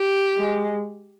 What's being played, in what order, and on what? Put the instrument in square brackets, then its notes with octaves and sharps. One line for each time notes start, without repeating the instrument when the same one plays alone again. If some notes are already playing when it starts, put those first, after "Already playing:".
Already playing: [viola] G4
[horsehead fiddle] G#3